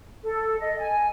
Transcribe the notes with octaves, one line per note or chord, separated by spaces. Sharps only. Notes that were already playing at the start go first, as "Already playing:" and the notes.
A4
D#5
G#5